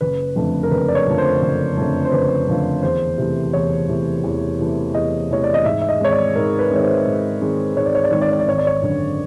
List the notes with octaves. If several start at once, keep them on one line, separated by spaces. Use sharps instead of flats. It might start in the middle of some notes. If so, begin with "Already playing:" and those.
F#1 B4
F2 D3 F3 A3
A#4
F#1 B4
D5
C#5
F2 D3 F3 A3
C5
F#1
F2 D3 F3 A3
C5
F#1 B4
F2 D3 F3 A3
E2 C5
C3 E3 A3
E2 C#5
C3 E3 A3
E2
C3 E3 A3
E2 D#5
C3 E3 A3 C#5
D5
D#5
G#2 E5
E5
D#5
D#3 G#3 C4 C#5
D5
G#2 A#4
B4
D#3 G#3 C4 C#5
C5
G#2
D#3 G#3 C4
G#2 C#5
D5
C#5
D5
D#3 G#3 C4 C#5
D5
C#5
D5
G#1 C#5
D5
C#5
F#2 D3